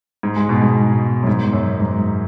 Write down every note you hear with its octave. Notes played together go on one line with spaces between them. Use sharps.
G#2
G#3
B2
G#2
F#2
G#2
F#2
G#2